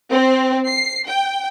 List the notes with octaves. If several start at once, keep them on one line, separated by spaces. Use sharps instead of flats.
C4
C7
G5